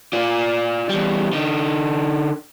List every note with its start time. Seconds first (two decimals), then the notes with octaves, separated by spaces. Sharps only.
0.13 F4 D5
0.89 E2 G3
1.33 D3 D#4